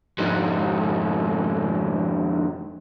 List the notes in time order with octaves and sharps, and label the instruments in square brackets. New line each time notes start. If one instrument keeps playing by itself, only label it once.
[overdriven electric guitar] F2 G#2